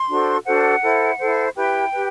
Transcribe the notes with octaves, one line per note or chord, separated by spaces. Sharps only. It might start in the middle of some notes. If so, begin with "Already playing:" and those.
Already playing: C6
D4 F#4 A4 C5
D4 F#4 A4 C5 F#5
E4 A4 C5
E4 A4 C5
E4 G4 B4 G5
G4 B4